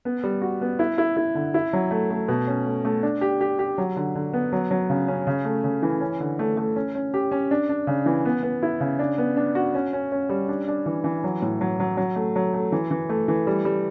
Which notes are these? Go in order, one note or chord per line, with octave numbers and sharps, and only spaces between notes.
B3
G3
F#4
B3
E4
E4
E4
D3
E4
F#3
A3
A3
B2
C#4
A3
A3
D4
G4
G4
G4
F#3
D3
D3
B3
F#3
F#3
C#3
C#4
C#3
A3
C#3
E3
C#4
D3
A3
A3
C#4
C#4
G4
C#4
D4
D4
C#3
E3
B3
B3
E4
C#3
D4
B3
D4
F#4
C#4
C#4
C#4
G3
D4
D4
E3
E3
F#3
A2
F#3
F#3
F#3
A3
F#3
A3
E3
E3
A3
E3
G3
G3